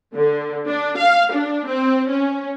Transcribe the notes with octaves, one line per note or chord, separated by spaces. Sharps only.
D3
D4
F5
D4
C4
C#4